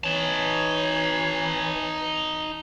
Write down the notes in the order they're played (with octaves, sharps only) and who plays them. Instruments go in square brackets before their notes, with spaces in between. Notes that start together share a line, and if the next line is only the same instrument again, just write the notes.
[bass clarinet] E3 [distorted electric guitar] D#4 A5 [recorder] C#5